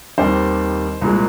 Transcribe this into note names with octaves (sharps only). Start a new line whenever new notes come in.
D#2 D#3 G3 C4 C5
C2 A#2 G#3